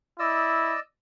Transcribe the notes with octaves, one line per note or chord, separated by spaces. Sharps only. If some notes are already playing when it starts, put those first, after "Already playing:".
E4 D5 D#5 E6